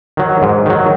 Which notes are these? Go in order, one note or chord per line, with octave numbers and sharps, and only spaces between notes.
D#3 F#3
G#2
D#3 F#3